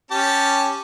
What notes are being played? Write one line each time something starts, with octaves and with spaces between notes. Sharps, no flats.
C#4 G4 A5